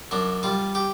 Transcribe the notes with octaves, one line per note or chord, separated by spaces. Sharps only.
F#2 D4
G3 F4
G4